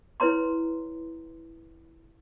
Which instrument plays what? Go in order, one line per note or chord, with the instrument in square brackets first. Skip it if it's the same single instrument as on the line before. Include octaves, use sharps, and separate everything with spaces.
[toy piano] E4 B4 C#5 A#5 C6